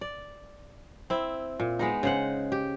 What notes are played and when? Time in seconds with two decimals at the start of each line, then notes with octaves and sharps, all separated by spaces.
0.01 D5
1.10 C4 E4
1.60 A#2
1.79 G#3 B3 D#4
2.03 C#3 C5 F#5
2.52 G4